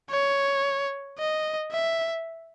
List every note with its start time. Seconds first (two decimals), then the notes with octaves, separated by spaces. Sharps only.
0.10 C#5
1.18 D#5
1.72 E5